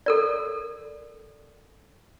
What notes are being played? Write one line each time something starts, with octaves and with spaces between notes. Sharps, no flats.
A4 A#4 D5